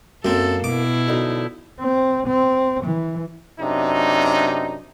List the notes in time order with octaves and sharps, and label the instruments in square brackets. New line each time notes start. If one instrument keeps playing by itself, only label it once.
[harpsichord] F#2 C4 [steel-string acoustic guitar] A#3 [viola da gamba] A4
[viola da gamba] B2 E4 [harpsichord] D6
[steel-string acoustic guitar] F#2 D3 D#4
[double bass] C4
C4
E3
[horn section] F#2 C3 D4 D#4